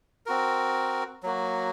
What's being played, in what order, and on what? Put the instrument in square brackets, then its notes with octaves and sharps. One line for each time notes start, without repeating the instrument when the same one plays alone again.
[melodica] C4 F#4 A#4
F#3 A#3 F#4